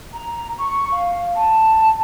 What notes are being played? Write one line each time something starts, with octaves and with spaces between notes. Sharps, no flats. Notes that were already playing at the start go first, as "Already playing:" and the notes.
A#5
C#6
F5
A5